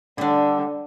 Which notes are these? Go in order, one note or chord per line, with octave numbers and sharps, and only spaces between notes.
D3 G3 D4